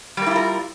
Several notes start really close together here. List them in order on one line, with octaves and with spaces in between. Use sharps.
G3 A#3 E4 F4 A#4